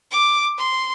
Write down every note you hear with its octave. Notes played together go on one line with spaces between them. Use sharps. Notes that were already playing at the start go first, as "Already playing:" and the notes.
D6
C6